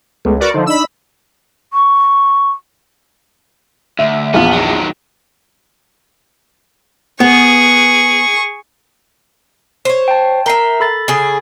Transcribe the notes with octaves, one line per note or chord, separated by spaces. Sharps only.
C#2 G#3 A3 B3
F#4 A#4 B4 D5
D3 F3 D#4 C5
D4 D#4 B5 E6
C#6
D2 E5
A#1 E2 B3 F4
D#3 F#3
B3 G#4 C#6
C5 C#5
G5 A5
A#4 E5 G5 A#5 C7
A4 B5 A6
C#3 G#4